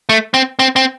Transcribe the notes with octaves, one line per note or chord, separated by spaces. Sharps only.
A3
C4
C4
C4